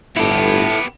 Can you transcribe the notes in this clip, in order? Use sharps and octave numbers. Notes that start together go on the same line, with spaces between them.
G1 B3 E4 G4 A4